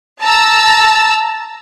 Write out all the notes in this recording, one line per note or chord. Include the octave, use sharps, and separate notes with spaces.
A5 A#5 E6